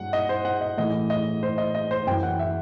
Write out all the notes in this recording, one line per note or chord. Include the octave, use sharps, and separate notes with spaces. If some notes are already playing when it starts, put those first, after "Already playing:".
Already playing: G2 F#3 F#5
D#5
C5
F#5
D#5
A2 E3 D#5
D#5
C5
D#5
D#5
C5
F#2 E3 G5
F#5
E5